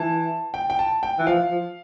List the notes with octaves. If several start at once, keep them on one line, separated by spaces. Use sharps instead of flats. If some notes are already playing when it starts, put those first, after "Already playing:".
Already playing: E3 A5
G5
G5
A5
G5
E3
F3 F5
F3